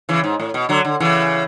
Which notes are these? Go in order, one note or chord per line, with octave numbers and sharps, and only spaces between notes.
C#3 E3
G#2
A2
B2
D3 F#3
D3
C#3 E3